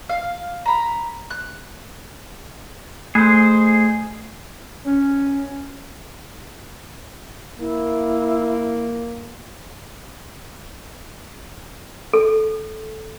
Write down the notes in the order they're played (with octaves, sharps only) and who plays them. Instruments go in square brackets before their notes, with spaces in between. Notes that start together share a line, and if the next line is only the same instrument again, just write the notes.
[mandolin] F5
A#5 B5
F#6
[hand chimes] A3 [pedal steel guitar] G#4 C5
[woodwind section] C#4
[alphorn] A#3 [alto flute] E4
[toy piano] A4